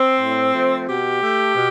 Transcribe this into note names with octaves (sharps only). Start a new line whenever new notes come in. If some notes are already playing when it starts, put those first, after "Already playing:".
Already playing: C4
A2
F3 A3
B2 G4
A3
B2